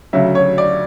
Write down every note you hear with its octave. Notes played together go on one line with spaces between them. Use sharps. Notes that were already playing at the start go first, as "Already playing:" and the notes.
D2 C#3 F#3 E5
C#5
D5